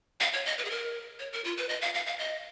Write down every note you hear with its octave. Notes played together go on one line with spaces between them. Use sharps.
F5
C#5
D#5
B4
G#4
A#4
C#5
A#4
F4
B4
D#5
F5
F5
F5
D#5